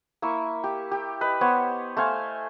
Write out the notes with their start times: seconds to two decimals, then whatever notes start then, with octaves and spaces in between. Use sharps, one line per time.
0.22 A#3 E4 E5 C#6
0.64 G4
0.91 G4
1.21 B4 D#5
1.41 B3 C5 C#5
1.97 A3 C5 F5 G#5